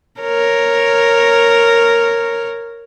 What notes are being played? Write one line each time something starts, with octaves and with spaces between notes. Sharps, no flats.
A#4 C#5